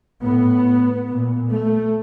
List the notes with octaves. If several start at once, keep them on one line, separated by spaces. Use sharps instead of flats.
A2 B3
A#2
A3